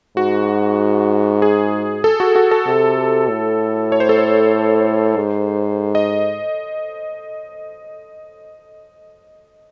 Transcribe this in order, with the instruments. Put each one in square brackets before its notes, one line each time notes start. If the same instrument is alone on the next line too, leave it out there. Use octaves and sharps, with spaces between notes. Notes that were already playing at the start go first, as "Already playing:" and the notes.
[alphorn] G#2 [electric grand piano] F#4
[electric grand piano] G#4
A4
F#4
F#4
A4
[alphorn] C3
A2
[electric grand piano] C#5
C5
A4
C5
[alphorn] G#2
[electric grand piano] D#5